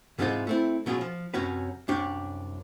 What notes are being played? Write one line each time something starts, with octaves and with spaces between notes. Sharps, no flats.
G#2 C3 E3 G#3 D#4 F4
A3 C4 E4
B2 F#3 C#4 F4 G#4
F3
F#2 C3 C#4 F#4 B4
C2 F#2 D4 G4 C#5